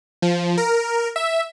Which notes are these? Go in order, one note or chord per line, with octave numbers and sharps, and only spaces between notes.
F3
A#4
E5